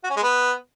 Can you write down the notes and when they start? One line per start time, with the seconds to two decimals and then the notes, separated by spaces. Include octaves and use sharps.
0.04 F#4
0.10 C#4
0.16 G#3
0.23 B3